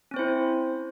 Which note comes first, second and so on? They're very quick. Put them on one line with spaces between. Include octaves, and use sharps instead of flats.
C#4 C4 C5 E4